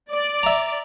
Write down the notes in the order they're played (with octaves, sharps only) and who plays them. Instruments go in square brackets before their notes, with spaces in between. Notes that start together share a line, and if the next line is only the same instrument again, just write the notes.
[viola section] D5
[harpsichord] E5 A#5